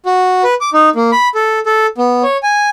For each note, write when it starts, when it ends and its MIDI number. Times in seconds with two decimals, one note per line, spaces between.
0.06 0.43 66
0.44 0.54 71
0.61 0.70 86
0.73 0.90 63
0.95 1.11 58
1.12 1.28 83
1.35 1.59 69
1.66 1.87 69
1.98 2.23 59
2.23 2.37 73
2.43 2.70 80